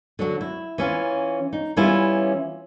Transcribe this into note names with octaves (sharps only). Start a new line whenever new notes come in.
D3 F#3 F#4
E4
E3 C#4 F4
D#4
E3 G3 B3 C#4 E4 F4